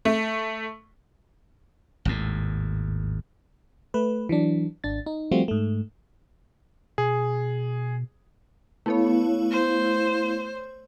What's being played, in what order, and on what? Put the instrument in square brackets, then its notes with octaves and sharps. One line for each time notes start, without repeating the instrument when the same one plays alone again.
[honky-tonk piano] A3
[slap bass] G#1 D#2 A2
[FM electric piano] A3 B4
E3 F#3 D4
G#1 D4 A6
D#4
F3 G3 A3 C4 F4 F#4
G#2 A3
[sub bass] B2 [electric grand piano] G#4
[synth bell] A3 B3 C#5 [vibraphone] E4 F5
[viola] C5